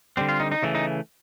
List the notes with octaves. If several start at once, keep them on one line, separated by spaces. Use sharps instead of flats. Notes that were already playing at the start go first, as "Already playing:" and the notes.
D3 G3 C4
F4
D#4
D#4
C#3 E3 A3
D#4